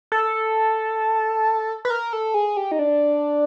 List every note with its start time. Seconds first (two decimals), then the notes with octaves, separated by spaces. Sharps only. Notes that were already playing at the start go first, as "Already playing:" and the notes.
0.12 A4
1.85 B4
1.90 A#4
2.13 A4
2.34 G#4
2.57 G4
2.72 D#4
2.79 D4